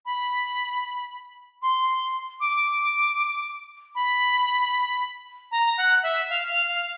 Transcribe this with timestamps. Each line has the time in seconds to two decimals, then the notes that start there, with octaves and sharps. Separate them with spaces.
0.06 B5
1.62 C6
2.40 D6
3.95 B5
5.51 A#5
5.78 F#5
6.03 E5
6.30 F5
6.49 F5
6.68 F5